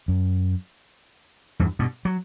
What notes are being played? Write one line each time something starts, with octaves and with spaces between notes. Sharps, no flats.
F#2
E2 G2
G2 B2
F#3